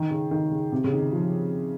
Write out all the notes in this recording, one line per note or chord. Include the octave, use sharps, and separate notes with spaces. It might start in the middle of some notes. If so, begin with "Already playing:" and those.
Already playing: D#3
C#3
D#3
C#3
C3
C#3
D#3
F3